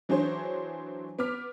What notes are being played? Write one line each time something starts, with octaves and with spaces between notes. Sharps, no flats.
E3 F#3 D4 G#4 C5 C#5
B3 D6 F6 B6